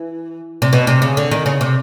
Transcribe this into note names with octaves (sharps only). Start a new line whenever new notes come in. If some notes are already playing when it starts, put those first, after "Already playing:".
Already playing: E3
C3
B2
C3
C#3
D3
D#3
C#3
C3